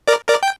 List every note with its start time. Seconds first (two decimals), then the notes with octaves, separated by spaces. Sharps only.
0.08 A#4 D5
0.29 A#4 D5
0.43 G5